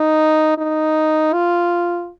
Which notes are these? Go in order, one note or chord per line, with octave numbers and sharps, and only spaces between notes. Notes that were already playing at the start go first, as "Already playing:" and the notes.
Already playing: D#4
D#4
F4